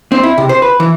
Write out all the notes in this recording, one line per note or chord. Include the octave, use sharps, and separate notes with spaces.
C4
E4
C3
C5
B4
E3